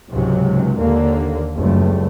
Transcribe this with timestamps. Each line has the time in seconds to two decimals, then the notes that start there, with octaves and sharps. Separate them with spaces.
0.11 C#2 G#2 C3 F#3
0.79 D#2 D3 A#3
1.56 F#1 C#2 G2 A3